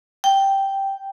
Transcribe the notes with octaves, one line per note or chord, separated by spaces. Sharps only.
G5